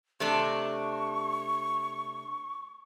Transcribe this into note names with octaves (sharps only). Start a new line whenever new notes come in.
C3 A3 D4 C#6